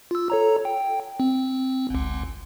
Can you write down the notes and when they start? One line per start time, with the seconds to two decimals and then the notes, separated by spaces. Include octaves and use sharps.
0.11 F4 E6
0.30 A4 C#5 A#5
0.65 G5
1.20 C4
1.90 G1 C#2